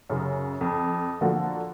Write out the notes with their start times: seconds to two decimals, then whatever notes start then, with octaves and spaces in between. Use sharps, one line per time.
0.10 F#2 C#3
0.61 F2
1.21 D3 F3 A#3 F#4 A4